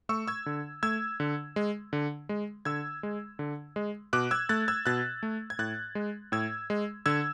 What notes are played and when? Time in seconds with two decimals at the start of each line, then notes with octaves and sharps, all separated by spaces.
0.09 A3 C#6 E6
0.27 E6 G#6
0.46 D3
0.83 A3 E6 G#6
1.20 D3
1.56 G#3
1.93 D3
2.29 G#3
2.65 D3 E6 G#6
3.03 G#3
3.39 D3
3.76 G#3
4.13 B2 D6 F#6
4.31 E6 G#6
4.49 A3 F#6 A6
4.68 E6 G#6
4.86 B2 F#6 A6
5.23 A3
5.50 G#6
5.59 A2 F#6 A6
5.95 G#3
6.32 A2 E6 G#6
6.70 G#3
7.06 D3 E6 G#6